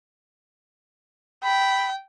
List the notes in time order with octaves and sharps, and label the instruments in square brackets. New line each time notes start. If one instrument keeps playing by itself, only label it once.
[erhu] G5 [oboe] B5